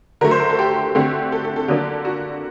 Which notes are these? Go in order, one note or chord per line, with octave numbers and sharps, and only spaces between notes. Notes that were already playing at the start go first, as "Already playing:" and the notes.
D3 F#3 A3 A#4
C5
A#4
A4
G4
D3 A3 C4
A4
A4
A4
D3 F#3 A#3 D4
F#4